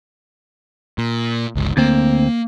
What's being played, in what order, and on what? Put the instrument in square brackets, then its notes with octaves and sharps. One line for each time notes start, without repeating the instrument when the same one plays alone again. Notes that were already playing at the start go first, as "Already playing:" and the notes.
[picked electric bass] A#2
G1 C#2
[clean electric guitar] D2 C4 [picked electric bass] A#3